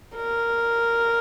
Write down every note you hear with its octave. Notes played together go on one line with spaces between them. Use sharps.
A#4